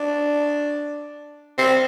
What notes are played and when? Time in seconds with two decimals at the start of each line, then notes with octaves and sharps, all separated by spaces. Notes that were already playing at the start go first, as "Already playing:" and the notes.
Already playing: D4
1.58 C4